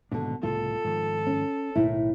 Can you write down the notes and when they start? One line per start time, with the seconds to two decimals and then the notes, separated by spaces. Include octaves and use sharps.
0.12 D#1 G#2 B2 D3 D4
0.43 C2 A2 C#3 F4 A4
0.85 G#2 D#3 F3
1.27 C#4
1.75 B1 A2 D#3 E4